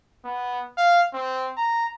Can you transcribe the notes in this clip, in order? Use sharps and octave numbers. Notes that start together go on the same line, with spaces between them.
B3
F5
C4
A#5